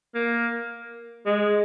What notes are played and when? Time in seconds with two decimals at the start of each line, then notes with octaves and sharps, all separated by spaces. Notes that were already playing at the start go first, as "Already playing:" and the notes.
0.15 A#3
1.26 G#3